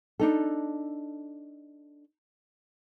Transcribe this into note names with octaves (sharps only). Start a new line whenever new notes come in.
D4 D#4 A4